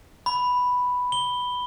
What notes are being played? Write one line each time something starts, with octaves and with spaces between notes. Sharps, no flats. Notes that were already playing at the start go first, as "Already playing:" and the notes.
B5
G7